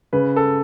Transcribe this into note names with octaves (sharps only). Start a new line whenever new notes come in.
C#3 B4
A4